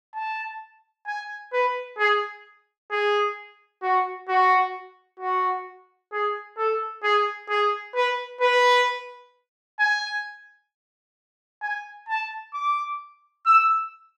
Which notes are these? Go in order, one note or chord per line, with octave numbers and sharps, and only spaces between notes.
A5
G#5
B4
G#4
G#4
F#4
F#4
F#4
G#4
A4
G#4
G#4
B4
B4
G#5
G#5
A5
D6
E6